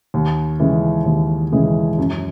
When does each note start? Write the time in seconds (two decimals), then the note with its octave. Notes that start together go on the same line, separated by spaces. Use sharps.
0.14 D#2
0.60 C#3 E3 G#3
1.05 D#2
1.52 C#3 E3 G#3
1.98 F#2